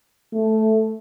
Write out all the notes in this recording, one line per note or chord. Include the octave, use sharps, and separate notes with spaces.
A3